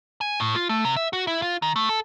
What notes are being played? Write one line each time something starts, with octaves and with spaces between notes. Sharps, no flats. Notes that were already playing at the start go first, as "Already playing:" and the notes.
G#5
A2
F4
A3
C3
E5
F#4
E4
F4
D#3
A3
A4